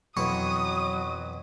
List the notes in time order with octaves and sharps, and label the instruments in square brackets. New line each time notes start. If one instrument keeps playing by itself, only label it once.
[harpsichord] F2 B2 E3 [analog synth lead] F#3 [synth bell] C#6 [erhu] D#6